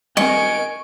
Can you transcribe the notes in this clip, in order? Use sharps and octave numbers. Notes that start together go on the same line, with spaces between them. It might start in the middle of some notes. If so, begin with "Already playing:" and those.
G3 G#3 C4 A#4 D#5 G#5 C#6 D7